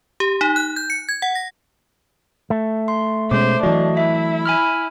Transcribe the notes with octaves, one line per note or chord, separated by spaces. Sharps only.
G4
D#4
F#6
G6
C#7
G#6
F#5
A#6
A3
C6
B2 G#3 C#4 C5 D6
E3 F#3 D4 F#4 D#5
E4 E5
G#5 B5 F6